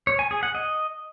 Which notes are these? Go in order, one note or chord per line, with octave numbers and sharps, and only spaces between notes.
C#5
G#5
G#4
F#5
D#5